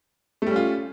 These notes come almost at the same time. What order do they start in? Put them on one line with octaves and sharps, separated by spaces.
A3 G3 C#4 F4